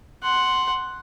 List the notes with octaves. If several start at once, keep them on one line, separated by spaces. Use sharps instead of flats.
F#5 C6